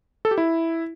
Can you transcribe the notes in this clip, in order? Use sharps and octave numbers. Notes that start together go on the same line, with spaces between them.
A4
G4
E4